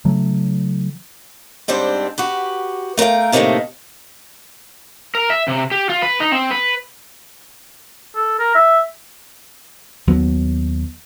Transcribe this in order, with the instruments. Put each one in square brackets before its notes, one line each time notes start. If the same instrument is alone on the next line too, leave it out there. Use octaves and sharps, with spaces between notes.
[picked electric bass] C#3 E3 F#3 A3
[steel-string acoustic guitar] G#2 G3 C4 D4 C5
F#4 G4 B4
A3 A#4 B4 F5 G5
A2 C3 D#3 F3 A3 A#3
[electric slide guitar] A#4
E5
C3
G4
F4
B4
D#4
C4
B4
[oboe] A4
A#4
E5
[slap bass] D#2 F#3 B3